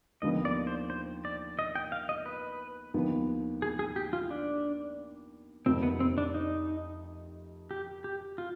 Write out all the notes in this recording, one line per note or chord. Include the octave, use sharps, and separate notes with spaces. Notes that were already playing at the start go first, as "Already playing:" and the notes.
D#2 D3 F3 B3 F4 D#5
D5
C5
C5
D5
D#5
G5
F5
D#5
B4
D#2 D3 F3 B3 D#4
G#4
G#4
G4
F4
D4
F2 C3 D#3 C4
B3
C4
D4
D#4
G4
G4
F4